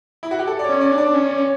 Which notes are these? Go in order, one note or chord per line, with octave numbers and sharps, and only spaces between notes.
E4
F#4
G4
A4
D5
C#5
C#4
D5
D4
D5
C#4 C#5
D5
C#5